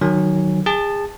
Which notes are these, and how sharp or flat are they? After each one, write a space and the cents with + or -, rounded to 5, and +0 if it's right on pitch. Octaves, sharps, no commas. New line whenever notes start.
D#3 -20 F#3 +0 G#5 +0
G#4 -30 A5 +0